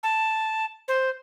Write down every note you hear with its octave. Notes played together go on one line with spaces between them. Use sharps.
A5
C5